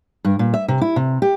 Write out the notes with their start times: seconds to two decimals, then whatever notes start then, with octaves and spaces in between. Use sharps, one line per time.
0.25 G2
0.39 A#2
0.54 E5
0.68 C3
0.81 E4
0.96 C3
1.22 G4